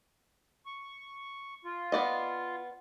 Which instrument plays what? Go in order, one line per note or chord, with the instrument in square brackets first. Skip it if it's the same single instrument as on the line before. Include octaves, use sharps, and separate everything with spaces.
[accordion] C#6
F4
[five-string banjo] B3 D5 D#5